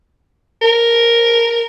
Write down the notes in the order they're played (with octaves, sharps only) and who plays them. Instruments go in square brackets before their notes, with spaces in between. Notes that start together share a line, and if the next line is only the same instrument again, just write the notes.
[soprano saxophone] A#4